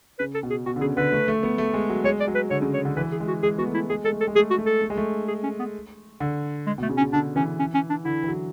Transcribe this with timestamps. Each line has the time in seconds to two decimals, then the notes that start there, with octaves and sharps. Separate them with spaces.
0.19 C#3 B4
0.34 A4
0.43 B2
0.50 G#4
0.66 B2 F#4
0.76 D3
0.81 C#3 G#4
0.97 D3 B4
1.12 A3
1.28 A3
1.43 B3
1.58 A3
1.73 G#3
1.90 F#3
2.04 G#3 C#5
2.20 D5
2.28 F#3
2.35 B4
2.50 D3 C#5
2.62 C#3
2.74 C#5
2.85 D3
2.96 E3 B4
3.12 G#4
3.20 G#3
3.28 F#4
3.43 G#3 G#4
3.58 B3 F#4
3.66 A3
3.74 E4
3.89 G#3 G#4
4.04 G#3 A4
4.12 A3
4.20 A4
4.28 G#3
4.35 A3 G#4
4.51 F#4
4.58 A3
4.66 A4
4.82 A3
4.90 G#3
4.97 A3
5.28 G#4
5.43 C#4
5.59 B3
6.20 D3
6.67 G#3
6.78 B2 A3
6.89 C#3
6.97 C#4
7.01 C#3
7.13 D3 D4
7.36 E3 C#4
7.60 C#4
7.75 C#4
7.90 D4
8.05 D3 E4
8.23 E3
8.28 F#3